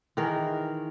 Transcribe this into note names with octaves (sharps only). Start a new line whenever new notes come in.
D#3 E3 G#4 A#4